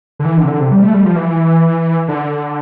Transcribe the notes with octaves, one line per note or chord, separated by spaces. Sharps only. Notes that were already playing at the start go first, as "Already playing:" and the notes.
D3
E3
D3
C3
D3
C3
G3
A3
G3
F3
E3
D3